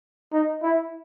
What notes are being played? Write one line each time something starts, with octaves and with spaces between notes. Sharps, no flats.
D#4
E4